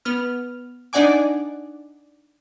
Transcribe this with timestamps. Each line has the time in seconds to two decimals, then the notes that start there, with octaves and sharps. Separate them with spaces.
0.05 B3 F6
0.93 D4 D#4 D5 F#5 G#5 D6